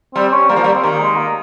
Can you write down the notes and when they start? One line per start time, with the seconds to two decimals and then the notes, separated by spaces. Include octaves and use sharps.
0.15 G3 C4
0.33 C#4
0.49 G3 A#3
0.56 F3
0.64 G3
0.74 C4
0.83 D#3 A#3
1.00 G#3
1.17 A#3